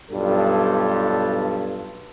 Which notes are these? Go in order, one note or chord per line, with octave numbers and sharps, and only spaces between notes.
B1 G2 G3 F4 A4